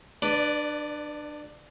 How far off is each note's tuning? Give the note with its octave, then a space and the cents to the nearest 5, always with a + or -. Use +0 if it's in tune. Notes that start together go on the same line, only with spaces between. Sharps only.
D4 +25 B4 +5 D5 -10